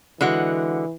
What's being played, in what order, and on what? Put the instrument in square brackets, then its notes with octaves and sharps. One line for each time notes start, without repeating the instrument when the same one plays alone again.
[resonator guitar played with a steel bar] D3 G#3 F#4 [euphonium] E3